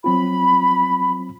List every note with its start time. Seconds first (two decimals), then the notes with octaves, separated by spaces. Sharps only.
0.04 F#3 C4 F4 B5